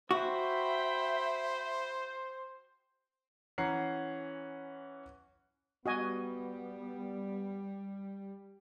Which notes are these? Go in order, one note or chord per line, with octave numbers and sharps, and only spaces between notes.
F#4 C5 E5 G5 B5
E3 C#4 F#5 A#5 C7
G3 B3 F#4 D#5 G#5